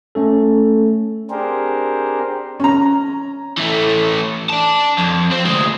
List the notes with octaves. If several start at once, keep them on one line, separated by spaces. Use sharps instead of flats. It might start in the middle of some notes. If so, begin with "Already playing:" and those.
A3 C#4 A4
C4 D4 G4 G#4 A#4 C5
C#4 A#5
E3 A3
D5 A5
F2
C4
D2 G#3